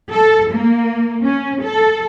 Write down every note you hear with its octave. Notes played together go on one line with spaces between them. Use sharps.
A4
A#3
C#4
A4